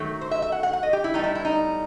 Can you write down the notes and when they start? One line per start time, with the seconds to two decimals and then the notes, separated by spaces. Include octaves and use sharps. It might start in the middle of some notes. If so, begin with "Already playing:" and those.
Already playing: D#3 F#3 A3
0.21 C5
0.31 E5
0.42 E5
0.52 F#5
0.63 F#5
0.73 F#5
0.83 D#5
0.93 G4
1.04 E4
1.14 A2 G3 B3 D#4
1.24 E4
1.35 E4
1.45 D#4